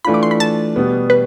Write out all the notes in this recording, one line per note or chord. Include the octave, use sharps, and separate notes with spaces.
E3 A3 D4 F4 B5
D6
C6
B5
A5
B2 G3 B3
B4